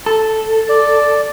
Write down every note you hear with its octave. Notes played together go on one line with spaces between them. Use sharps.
A4
D5